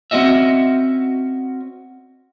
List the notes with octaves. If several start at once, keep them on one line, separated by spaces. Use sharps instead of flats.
C4 C#4 F#4 D#5 E5